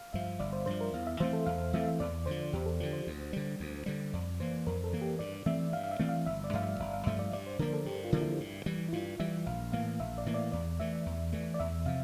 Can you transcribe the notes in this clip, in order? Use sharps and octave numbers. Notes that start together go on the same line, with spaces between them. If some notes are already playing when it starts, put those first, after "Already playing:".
Already playing: F5
G2 F3 E5
G1 D5
C5
G2 F3 C5
A#4
E2 F5
E5
E3 A3 C4 C5
A4
E2 F5
E3 A3 C4 E5
E5
E2 D5
D3 F3 C5
E2 G4
A4
D3 F3
C5
D2
D3 G3
D2
D3 G3
F2 D5
E3 A#3 C5
F2 A#4
A4
E3 A#3
G4
G2 D5
E3 A3 C4 E5
G2 F5
F5
E5
E3 A3 C4
F5
G1 E5
D5
G2 F3 A3 F5
E5
G1 E5
F5
G2 F3 A3 E5
D5
G2 D5
C5
D3 F3 A#3 A#4
A4
G2 G4
F4
D3 F3 A#3
E4
G2
E3 G3
E4
G2 F4
E3 G3 E5
A#1 F5
A2 E3 A#3 F5
A#1 E5
D5
A2 E3 A#3
D5
E2 D5
E3 A3 E5
E2
E3 A3
D5
E2 E5
C3 F3 F5